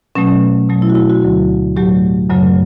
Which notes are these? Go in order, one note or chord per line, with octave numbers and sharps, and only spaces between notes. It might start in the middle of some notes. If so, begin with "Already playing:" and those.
B2 F#3 A3 C#4
B2 F#3 A3
E4
F#4
E4
F#4
D2 D3 F#3
A2 F#3 A3 G4
F#2 C#3 F#3 A3